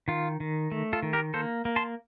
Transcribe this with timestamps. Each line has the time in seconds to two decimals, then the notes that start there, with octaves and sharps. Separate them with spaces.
0.08 D#3 F4
0.40 D#3
0.71 A3
0.93 F4 A4
1.03 D#3
1.13 G4 A#4
1.34 A#3 A4 C5
1.65 A#3
1.76 A5 C6